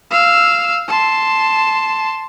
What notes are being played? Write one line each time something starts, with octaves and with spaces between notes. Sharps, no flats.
F5 E6
A5 C6